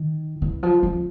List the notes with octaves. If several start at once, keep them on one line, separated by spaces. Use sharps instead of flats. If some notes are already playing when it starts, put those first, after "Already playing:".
Already playing: D#3
E3
F3
F3